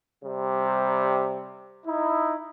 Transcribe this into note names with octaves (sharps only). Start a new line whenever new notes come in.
C3 G3
D#4 E4